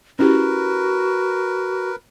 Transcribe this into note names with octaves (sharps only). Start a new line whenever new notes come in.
C#4 E4 F#4 G4 A#4 B4